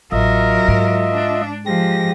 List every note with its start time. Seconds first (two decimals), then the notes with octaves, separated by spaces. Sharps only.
0.12 A1 F#3 F4 A#4 D#5 E5
0.68 G#2
1.14 D4
1.66 F3 G#3 G4 A#6